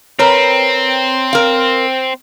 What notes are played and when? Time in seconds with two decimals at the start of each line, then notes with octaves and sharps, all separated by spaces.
0.19 C4 A#4 B4 C#5 A#5
1.33 A#4 F5